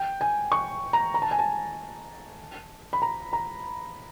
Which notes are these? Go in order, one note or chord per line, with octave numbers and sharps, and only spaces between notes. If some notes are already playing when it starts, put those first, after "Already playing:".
Already playing: G5
G#5
C#6
A#5
A#5
A5
G#5
A5
B5
A#5
A#5